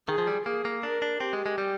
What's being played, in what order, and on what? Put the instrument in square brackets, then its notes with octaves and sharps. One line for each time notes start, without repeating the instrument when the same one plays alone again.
[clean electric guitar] D#3 [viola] G#4
[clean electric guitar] F3
G3
[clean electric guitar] A#3 [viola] G#4
[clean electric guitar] A#3
[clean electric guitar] D4 [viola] A#4
[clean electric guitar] D4
[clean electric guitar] C4 [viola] G4
[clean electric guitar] G#3
G#3
G3